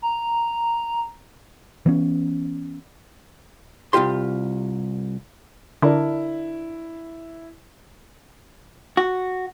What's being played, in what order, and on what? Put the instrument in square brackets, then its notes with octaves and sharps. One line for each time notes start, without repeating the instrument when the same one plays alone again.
[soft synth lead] A#5
[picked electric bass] E3 B3 C#4
[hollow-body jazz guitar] C2 A#2 F4 G4 C6
[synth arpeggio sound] D3 [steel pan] D4 A#4 [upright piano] E4
[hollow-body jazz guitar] F#4